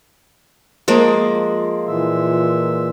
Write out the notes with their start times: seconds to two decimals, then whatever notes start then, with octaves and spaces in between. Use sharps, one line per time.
0.88 F3 G#3 A#3
1.87 A#2 E3 E5